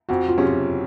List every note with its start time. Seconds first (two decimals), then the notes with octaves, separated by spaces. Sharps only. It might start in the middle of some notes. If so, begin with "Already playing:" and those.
0.09 F2 F#4
0.28 F4
0.38 C3 F#3 C#4 G#4
0.47 F4